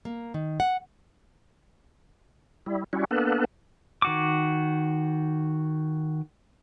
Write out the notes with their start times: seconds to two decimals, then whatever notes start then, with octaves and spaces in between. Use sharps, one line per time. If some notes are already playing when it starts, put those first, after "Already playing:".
0.05 A#3
0.34 D#3
0.60 F#5
2.66 G3 E4
2.93 G3 C#4 E4 F#4
3.11 A#3 B3 D4 A4 B4
4.02 D#3 F#4 D6